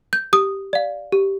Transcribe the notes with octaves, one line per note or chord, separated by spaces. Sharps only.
G6
G4 D#6
D5 F5
G4